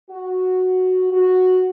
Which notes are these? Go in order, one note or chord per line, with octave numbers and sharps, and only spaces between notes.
F#4
F#4